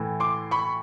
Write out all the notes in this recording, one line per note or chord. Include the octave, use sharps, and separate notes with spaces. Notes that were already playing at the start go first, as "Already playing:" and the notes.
Already playing: A2 E3
C6 D6
B5 C#6